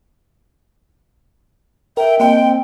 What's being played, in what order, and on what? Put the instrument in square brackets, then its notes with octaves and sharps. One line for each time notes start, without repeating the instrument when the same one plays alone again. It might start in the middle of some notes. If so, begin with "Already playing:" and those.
[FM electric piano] A#4 [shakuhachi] E5 [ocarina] G5
[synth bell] A#3 D#5 [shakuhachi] C4 [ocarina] G5